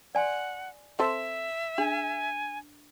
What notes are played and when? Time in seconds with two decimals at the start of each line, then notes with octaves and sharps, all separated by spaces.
0.15 D5 F#5 G#5 C6
0.99 C4 A4 C5 E5
1.78 D4 G#4 G#5